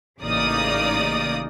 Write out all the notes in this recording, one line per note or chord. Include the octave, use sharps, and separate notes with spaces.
A1 C#3 A#3 D#4 D5 D#6